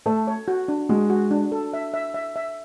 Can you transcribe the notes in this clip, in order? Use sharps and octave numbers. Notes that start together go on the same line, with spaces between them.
A3 A4
C#5
F#4
D4
G#3 F#4
F#4
D4
A4
E5
E5
E5
E5